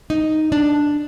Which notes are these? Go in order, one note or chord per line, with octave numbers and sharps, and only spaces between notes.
D#4
D4